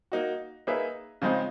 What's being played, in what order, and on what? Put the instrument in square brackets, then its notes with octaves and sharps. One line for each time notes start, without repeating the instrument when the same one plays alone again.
[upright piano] A#3 D#4 F#4
A#3 D#4 G#4 B4 E5
C#3 F3 G#3 C4 D#4